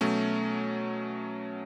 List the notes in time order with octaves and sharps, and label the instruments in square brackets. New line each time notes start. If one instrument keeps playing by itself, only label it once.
[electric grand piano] B2 F#3 A3 C#4